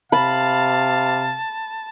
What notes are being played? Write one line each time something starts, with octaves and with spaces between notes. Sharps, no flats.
C3 F5 A5 B5